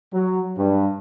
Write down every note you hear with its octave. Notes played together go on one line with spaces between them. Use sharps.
F#3
G2